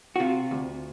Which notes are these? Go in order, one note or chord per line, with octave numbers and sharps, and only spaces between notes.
F#4
C3 F4
D2